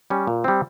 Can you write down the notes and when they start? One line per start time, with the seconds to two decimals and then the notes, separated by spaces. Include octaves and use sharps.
0.10 G3 C#4
0.27 A#2
0.44 G3 C4